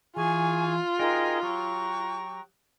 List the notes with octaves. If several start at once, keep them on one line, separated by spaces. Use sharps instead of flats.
E3 F4 G#4 G#5 C#6
D#4 F#4 G#4 A#4 D#5 G5
F#3 G4 G5 A#5 C#6